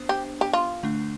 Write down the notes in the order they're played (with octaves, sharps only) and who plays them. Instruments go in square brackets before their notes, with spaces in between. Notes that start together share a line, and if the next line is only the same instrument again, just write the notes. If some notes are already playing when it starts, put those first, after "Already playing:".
Already playing: [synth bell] B3 D4 C5
[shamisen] G4
G4
F4
[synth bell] D3 A3 D4